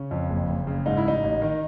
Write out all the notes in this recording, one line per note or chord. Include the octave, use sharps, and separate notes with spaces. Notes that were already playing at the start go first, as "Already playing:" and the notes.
Already playing: C#3 C#4
F2
F#1
F#1
C#3
G#2 D#4
E4
A1 D#4
A1
D#3